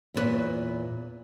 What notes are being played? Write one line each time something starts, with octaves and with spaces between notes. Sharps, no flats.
E2 A#2 D4 B4 C#5